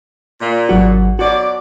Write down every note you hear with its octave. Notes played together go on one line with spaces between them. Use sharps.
A#2
G#1 F#3 F#4
B2 F#3 F#4 D5